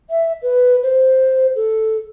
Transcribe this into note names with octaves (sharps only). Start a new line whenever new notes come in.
E5
B4
C5
A4